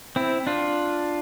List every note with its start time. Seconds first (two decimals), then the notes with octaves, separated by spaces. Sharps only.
0.16 C4 E4
0.47 D4 F4